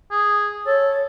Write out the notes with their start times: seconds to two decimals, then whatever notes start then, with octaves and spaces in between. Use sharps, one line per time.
0.11 G#4
0.66 A4 C#5